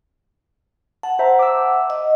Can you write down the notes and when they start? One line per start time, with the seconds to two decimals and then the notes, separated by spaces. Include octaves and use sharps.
1.03 F#5 A5
1.19 C5 E5 A#5
1.39 D6 E6
1.90 D#5